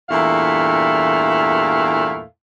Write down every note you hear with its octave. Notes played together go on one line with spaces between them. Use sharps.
E2 G2 A#2 A3 E4 F5